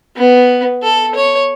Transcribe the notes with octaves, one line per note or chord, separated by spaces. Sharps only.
B3
A4
C#5